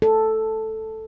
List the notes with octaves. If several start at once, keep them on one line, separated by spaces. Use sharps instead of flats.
A4